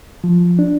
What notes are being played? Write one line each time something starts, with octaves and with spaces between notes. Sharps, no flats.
F3
D4